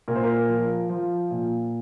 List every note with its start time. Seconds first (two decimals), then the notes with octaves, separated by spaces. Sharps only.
0.08 A#2 A#4
0.16 C5
0.24 A#4
0.49 F3
0.89 F3
1.31 A#2